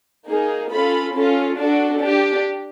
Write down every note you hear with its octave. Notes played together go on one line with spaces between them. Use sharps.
A#3 D#4 G#4
C#4 F4 A4 B5
C#4 F4 A4
D4 F#4 A4
D4 G4